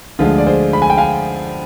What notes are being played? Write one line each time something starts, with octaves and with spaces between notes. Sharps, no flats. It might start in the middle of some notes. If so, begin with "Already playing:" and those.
D2 D3 F3 G#3 F4 G#4
D5
G#4 C5
B5
G#5
G5
F5 G#5